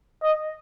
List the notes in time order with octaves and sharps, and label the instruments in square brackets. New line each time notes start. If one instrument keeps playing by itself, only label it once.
[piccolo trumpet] D#5